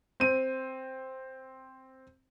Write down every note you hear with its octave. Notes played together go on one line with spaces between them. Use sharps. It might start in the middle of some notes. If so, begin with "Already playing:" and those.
C4 D#7